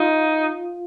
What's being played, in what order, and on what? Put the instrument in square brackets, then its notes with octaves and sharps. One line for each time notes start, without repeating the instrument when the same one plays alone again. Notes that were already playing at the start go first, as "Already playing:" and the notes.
Already playing: [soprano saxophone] D#4 [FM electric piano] F4